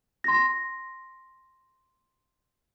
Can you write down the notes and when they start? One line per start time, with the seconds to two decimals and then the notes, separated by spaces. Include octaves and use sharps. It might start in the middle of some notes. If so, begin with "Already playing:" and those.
0.24 C6 A#6